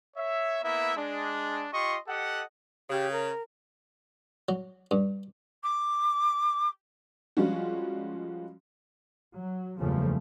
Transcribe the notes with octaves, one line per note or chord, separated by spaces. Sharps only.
C#5 E5
A#3 B3 E4 E5
G#3 D4
F4 G4 D#5 C6 C#6
G4 A4 D#5 F#5
C#3 G4
A#4
F#3
G2
D6
F3 G3 G#3 C#4 F4 F#4
F#3
F#1 E2 G2 C#3 F3 A3